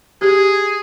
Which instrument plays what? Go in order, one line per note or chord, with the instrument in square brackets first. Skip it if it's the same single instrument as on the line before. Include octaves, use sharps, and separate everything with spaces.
[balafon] G4 [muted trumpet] G#4